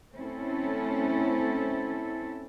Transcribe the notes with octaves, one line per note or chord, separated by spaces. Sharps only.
A3 C4 C#4 E4 A4